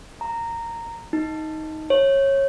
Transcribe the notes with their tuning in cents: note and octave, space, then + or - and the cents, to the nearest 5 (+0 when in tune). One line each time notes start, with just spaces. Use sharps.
A#5 -15
D#4 +10
C#5 -20